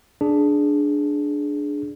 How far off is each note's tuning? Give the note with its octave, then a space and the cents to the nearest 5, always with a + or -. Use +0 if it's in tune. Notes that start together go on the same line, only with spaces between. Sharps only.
D4 +0 G#4 +15